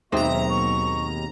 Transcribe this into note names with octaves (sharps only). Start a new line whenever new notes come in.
D#2 G#2 B2 F#3 C4 D#5 E5 A#5
C#6